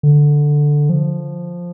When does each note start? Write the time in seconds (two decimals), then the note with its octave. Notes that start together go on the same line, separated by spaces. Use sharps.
0.03 D3
0.90 F3